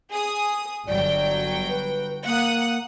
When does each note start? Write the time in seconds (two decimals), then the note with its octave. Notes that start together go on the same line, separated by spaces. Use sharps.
0.10 G#4 D#6
0.88 G1 F#3 D5 G5
1.69 B4
2.26 A#3 F#5 D#6